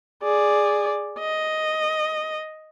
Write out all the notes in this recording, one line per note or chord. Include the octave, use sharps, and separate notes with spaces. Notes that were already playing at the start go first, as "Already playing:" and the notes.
G#4 D5
D#5